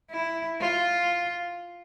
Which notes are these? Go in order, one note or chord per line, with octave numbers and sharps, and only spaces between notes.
E4
F4